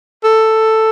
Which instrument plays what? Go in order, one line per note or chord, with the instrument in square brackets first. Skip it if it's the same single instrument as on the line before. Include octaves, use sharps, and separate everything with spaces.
[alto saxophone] A4